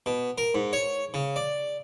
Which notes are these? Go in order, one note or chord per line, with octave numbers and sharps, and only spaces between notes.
B2
A#4
G#2
C#5
C#3
D5